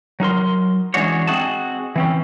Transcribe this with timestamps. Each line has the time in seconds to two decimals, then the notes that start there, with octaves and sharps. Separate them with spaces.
0.20 F#3 D#4 A#4 C6
0.94 E3 G#3 C#4 D4 F#4 C#5
1.27 C4 D#4 F#4 G#4 A5
1.96 E3 C4 C#4